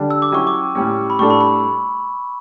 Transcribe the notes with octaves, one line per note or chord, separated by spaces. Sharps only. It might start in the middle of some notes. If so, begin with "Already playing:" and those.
Already playing: D3 G3 D4
E6
D6
F#3 C#4 E4 G4 C#6
D6
A2 G3 C#4
B5
A2 G3 D4 A4 C#6
B5
B5